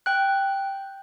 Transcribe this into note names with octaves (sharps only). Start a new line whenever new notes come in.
G5 F#6